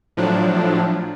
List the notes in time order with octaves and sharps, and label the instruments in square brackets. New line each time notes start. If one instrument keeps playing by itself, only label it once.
[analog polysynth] A2 F3 F#3 D4